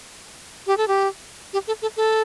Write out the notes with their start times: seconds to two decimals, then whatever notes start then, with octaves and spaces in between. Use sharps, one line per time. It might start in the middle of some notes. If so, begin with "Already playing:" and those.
0.67 G4
0.77 A4
0.88 G4
1.53 G4
1.67 A4
1.82 A4
1.97 A4